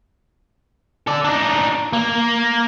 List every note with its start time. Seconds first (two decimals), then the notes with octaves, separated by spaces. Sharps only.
1.07 A4 D5
1.24 D4 D#4
1.93 A#3